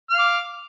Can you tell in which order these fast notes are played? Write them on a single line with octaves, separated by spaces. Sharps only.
F6 F5 D6